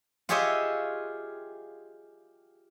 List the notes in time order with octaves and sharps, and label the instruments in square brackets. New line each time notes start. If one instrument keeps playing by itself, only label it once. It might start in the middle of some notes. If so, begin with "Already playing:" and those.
[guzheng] F4 G4 G#4 C#5 D#5 E5